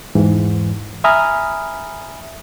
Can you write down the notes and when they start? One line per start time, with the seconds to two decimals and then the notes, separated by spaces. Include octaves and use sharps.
0.15 E2 G#2 E3
1.04 E5 G#5 A#5 B5 D#6 F6